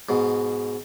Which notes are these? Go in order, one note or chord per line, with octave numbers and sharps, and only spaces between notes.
G#2 B2